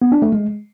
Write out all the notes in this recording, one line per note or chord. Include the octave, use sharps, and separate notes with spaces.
B3
D4
A3
G#3